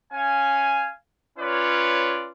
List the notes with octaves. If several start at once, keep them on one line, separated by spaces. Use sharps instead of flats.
C#4 F5 G#5
C#4 F4 B4 C#5 D5